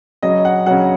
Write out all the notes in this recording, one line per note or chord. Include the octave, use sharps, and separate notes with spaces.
C#3 F#3 D#5
F#5
C#3 F#3 F#5